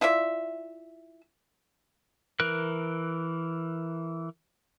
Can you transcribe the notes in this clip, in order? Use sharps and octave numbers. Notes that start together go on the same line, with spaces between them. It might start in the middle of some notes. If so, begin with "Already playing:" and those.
E4 F4 D5 E5
E3 A#4 F#6